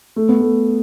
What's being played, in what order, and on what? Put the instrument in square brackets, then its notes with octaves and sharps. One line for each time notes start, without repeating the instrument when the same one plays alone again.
[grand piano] A3
B3
A3